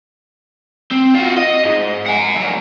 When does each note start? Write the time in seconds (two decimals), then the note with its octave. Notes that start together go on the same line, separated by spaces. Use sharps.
0.92 C4
1.15 F4 F#4
1.37 D#5
1.65 G#2
2.06 F#5 G#5
2.36 F#3 A3